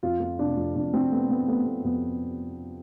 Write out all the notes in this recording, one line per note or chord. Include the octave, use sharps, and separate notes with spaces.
F2 F4
F2
C3 D4
F2
F2 D4
C3 C4
A3 B3
A3 B3
A3 B3
A3 B3
F2 B3